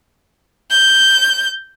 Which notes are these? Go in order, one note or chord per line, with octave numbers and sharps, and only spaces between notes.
G6